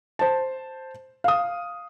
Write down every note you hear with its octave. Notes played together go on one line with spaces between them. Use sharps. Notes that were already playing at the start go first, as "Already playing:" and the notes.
C5 A5
F5 D#6